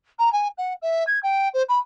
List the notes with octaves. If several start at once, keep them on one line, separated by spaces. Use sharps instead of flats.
A#5
G#5
F#5
E5
G#6
G5
C5
B5